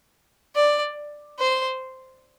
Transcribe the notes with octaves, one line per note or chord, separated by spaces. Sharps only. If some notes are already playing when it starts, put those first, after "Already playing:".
D5
C5